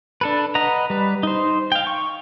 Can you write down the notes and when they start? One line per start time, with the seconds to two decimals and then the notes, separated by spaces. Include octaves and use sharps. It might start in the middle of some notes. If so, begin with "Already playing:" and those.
0.21 D4 A4 B4
0.55 B4 D#5 F#5 A#5
0.90 G3 B4
1.23 D#4 C5
1.72 F5 G5
1.87 C#6